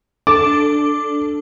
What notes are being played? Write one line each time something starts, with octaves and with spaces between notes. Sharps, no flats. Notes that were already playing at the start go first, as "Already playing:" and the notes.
D4 A4 D6